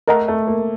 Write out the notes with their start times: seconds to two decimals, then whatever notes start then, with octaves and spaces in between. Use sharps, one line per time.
0.08 A3 A#4 D#5 F#5 A#5
0.28 A3
0.47 A#3